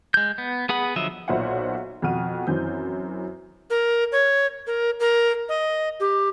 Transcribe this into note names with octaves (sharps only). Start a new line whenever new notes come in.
G#3 G6
B3
B3 G#4 F#5 B5
D3 F3 F#3 D#5 E5
B1 A#2 C5 C#5 E5 F#5
F2 B2 F#4 F6 D#7
F#2 E3 C4 G6
A#4
C#5
A#4
A#4
D#5
G4